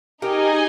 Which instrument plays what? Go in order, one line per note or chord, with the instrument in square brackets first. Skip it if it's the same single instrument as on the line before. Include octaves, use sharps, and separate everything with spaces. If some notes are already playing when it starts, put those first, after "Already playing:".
[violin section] D#4 G#4 D#5 G#5 [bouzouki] G4 A#4